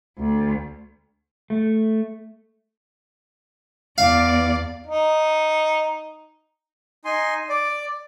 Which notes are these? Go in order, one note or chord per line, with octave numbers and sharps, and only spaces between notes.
D2
A3
E2 D5 F5
D#4
D#4 G#5 C6
D5